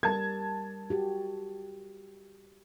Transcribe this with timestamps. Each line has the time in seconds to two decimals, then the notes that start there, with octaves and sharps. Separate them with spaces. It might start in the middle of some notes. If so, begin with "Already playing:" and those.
0.03 G3 A#4 A5 G#6
0.90 F#4 G4